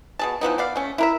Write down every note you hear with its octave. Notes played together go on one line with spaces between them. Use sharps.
B2 G#4 A5
E3 F3 B3 D#4
B3 D5 F5
A3 C#4
E4 A#4 E5